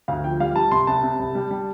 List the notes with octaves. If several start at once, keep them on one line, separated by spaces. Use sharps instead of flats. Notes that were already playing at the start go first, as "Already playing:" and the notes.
D2 F5
F3 G5
G3 F5
G3 A5
C2 C6
C2 A5
C3
C2
G3
G3